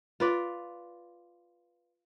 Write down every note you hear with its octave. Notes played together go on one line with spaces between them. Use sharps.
F4 B4 D5